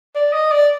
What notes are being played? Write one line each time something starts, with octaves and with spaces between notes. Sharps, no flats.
D5
D#5
D5